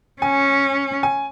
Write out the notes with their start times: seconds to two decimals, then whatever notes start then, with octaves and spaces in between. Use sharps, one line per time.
0.22 C#4 G#5
1.03 G#5